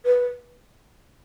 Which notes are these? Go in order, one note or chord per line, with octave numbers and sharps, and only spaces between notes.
B4